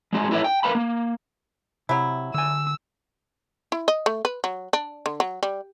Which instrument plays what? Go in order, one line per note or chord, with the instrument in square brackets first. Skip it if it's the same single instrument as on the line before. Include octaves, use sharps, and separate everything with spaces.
[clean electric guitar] G#3 C4 F#4 G#4
E4 A4 B4 C#5 D5 E5
G5
A#4 B4 F5 B5
A#3
[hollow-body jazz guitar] C3 [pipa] F#3 E4
[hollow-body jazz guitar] D3 G#5 [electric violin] E6
[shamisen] E4
D#5
A3
B4
F#3
D4
D3
F#3
G3